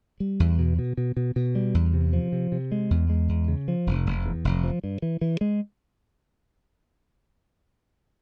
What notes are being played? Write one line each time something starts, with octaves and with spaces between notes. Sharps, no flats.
G3
E2
B2
B2
B2
B2
B2
G3
E2
C3
F3
C3
C3
G#3
E2
G#3
E2
C#3
F3
F1
F1
E2
F1
F3
G2
E3
E3
G#3